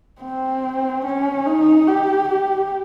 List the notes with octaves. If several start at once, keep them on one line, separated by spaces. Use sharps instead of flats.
C4
C#4
D#4
G4
G4